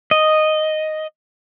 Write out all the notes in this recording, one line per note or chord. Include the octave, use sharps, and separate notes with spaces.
D#5